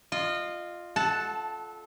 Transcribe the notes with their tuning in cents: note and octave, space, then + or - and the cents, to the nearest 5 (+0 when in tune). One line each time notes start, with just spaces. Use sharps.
F4 +0 D#5 -25
A4 -25 F#5 +0 A5 +0